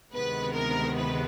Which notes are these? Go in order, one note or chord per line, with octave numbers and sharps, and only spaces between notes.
D2 C3 D#3 G#3 B3 B4
A#4
B4